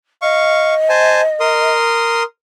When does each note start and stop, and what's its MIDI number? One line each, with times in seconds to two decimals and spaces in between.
0.22 1.74 75
0.22 0.74 77
0.22 0.74 85
0.89 1.21 72
0.89 1.21 80
0.89 1.21 81
1.40 2.23 70
1.40 2.23 84
1.40 2.23 87